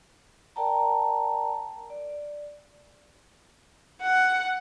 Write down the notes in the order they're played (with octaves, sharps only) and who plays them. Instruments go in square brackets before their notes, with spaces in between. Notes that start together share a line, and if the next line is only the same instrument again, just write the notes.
[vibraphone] A#4 D5 G5 A5 A#5
D5
[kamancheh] F#5